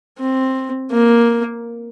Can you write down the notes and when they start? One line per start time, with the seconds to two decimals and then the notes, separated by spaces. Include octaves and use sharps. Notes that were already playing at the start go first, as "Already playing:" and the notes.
0.19 C4
0.92 A#3